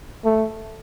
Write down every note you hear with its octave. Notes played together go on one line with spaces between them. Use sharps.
A3